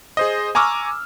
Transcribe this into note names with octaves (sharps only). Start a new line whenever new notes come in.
G#4 C5 D#5
G#5 A#5 C#6 D6 E6 F6